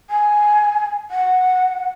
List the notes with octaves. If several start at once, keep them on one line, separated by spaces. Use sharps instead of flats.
G#5
F#5